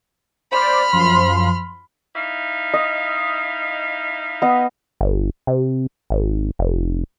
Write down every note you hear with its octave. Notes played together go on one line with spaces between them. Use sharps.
C5 D5 B5 F6
F#2 F3 C6
D#4 E4 F5
D#5
B3 D#5
G1
C3
G#1
F1